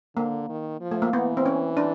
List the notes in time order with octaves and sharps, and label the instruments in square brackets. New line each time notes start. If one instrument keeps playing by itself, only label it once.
[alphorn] D3 [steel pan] A#3
[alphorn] D#3
F3
[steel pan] A3
A#3
[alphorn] E3 [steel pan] B3
[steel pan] C4
C#4
D4